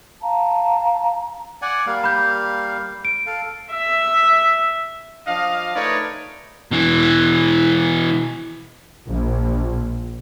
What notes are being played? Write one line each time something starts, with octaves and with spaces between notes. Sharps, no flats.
F5 A5 A#5
D5 F#5 G#5
G3 A#3 F5
B5 G6
D7
A4 F5
E5
F3 D4 D#5 F5
A3 D#4 A#4 B4 C#5 D5
B2 E3
A#1